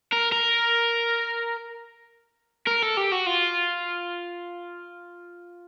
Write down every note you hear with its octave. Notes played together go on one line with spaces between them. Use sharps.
A#4
A#4
A#4
A4
G4
F#4
F4